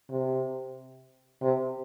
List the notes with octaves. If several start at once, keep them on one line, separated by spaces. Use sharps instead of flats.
C3
C3